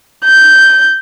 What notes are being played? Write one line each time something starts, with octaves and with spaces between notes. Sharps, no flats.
G6